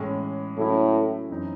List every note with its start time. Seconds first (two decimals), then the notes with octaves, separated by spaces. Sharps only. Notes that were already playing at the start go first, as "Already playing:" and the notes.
Already playing: A2 E3 G#3 C#4
0.57 A2 C#3 F#3 C#4 E4
1.29 F#2 E3 C4 D#4